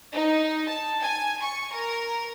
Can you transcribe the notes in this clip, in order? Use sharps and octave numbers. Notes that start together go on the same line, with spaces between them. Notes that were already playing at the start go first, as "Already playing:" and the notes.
D#4
A5
G#5
C#6
A#4